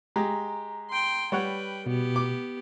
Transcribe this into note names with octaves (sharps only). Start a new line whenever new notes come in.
G#3 G4 A#5
G5 C6
G3 B4 C#5 F#5 G5
B2 B3 G4
D6